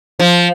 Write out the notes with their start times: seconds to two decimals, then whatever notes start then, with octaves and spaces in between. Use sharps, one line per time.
0.19 F3